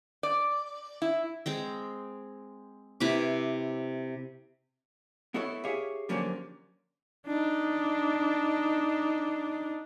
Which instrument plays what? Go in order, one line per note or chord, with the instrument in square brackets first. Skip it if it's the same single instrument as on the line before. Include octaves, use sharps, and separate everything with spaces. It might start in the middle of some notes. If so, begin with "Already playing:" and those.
[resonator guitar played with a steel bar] D5
E4
[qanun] G#3 C4 G5
C3 E4 B4 D6
[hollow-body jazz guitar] B3 E4 F#4 A4 C#5
G4 G#4 C#5 E5 F5
D3 F3 F#3 A#3 C#4 G4
[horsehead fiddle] D4 D#4